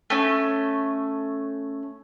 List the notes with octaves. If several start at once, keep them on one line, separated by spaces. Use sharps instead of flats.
A3 C#4